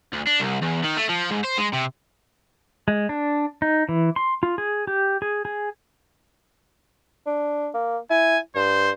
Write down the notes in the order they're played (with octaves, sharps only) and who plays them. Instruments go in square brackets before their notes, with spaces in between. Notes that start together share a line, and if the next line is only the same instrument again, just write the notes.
[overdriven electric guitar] D2
D4
C2
E2
D#3
A3
F3
G#2
C5
G#3
C3
[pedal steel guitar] G#3
D4
D#4
E3
C6
F4
G#4
G4
G#4
G#4
[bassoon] D4
A#3
[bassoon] E4 [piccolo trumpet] G#5
[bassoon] G2 [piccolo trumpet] C5